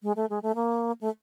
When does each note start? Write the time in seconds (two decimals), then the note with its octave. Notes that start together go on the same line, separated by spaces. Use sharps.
0.03 G#3
0.16 A3
0.30 G#3
0.43 A3
0.55 A#3
1.01 A3